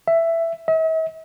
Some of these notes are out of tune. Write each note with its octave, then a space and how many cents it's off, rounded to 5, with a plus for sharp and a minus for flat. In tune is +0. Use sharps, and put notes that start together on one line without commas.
E5 +10
E5 -45